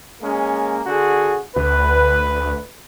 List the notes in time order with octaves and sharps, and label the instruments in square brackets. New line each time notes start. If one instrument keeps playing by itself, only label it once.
[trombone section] G#3 A#3 C#4
D3 F#4 G#4
[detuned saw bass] D2 [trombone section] B4